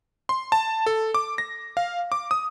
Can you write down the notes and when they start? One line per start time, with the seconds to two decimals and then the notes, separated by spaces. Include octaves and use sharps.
0.29 C6
0.52 A5
0.86 A4
1.14 D6
1.38 A#6
1.77 F5
2.12 D6
2.31 D#6